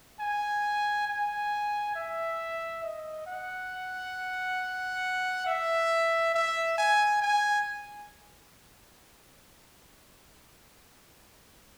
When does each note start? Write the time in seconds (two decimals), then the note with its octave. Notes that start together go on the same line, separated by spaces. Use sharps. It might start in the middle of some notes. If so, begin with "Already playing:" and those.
0.20 G#5
1.08 G#5
1.96 E5
2.84 D#5
3.27 F#5
5.47 E5
6.34 E5
6.78 G#5
7.22 G#5